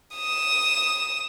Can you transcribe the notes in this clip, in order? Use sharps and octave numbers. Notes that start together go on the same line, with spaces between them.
D#6 E7